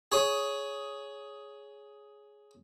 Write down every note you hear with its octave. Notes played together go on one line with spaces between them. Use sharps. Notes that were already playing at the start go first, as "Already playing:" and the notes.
G#4 C#5 D#6